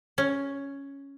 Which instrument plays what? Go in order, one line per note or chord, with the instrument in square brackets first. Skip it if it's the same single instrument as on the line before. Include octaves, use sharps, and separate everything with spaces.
[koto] C#4